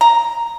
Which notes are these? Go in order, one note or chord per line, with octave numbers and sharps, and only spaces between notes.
A#5